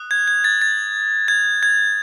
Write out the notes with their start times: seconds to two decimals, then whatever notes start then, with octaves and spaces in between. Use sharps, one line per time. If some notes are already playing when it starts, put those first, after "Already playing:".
Already playing: D#6 F#6
0.11 G#6
0.28 G#6
0.44 A6
0.62 A6
1.28 G#6
1.63 G#6